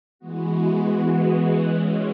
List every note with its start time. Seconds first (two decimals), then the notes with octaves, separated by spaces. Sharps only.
0.19 E3 G#3 B3 F#4
1.67 E3 G#3 C#4